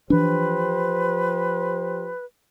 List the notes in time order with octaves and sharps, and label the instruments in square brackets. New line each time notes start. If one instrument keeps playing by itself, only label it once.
[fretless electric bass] E3 D4 [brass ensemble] F3 G4 C5 [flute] B4